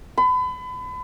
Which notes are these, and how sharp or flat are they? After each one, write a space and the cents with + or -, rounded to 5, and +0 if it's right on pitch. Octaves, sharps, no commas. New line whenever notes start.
B5 +35